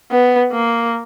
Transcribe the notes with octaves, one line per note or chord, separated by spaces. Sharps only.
B3
A#3